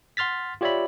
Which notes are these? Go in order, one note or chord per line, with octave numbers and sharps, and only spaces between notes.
F#5 C6 F6 A6 B6
F4 G4 C#5 D5 E5 B5